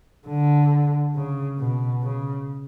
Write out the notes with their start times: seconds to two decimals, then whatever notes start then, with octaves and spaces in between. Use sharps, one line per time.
0.27 D3
1.15 C#3
1.59 B2
2.02 C#3